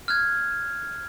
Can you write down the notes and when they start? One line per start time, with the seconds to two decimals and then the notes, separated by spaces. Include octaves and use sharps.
0.08 F6 F#6 G#6